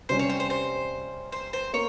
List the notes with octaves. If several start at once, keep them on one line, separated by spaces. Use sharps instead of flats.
C3 G3 C#4 C5
C#5
C5
C5
C5
C5
C5
A#3 C#5